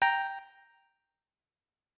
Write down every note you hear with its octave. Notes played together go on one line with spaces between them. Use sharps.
G5 A#5